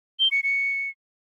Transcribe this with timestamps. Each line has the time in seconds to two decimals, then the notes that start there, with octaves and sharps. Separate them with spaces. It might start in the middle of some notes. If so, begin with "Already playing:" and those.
0.20 G7
0.31 C#7
0.43 C#7